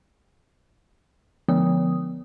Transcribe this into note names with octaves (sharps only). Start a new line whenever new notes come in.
D3 F3 B3 D#6